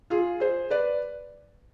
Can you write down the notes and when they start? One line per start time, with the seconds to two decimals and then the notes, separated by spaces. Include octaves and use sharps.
0.10 F4 G#4
0.40 G#4 C5
0.70 B4 D5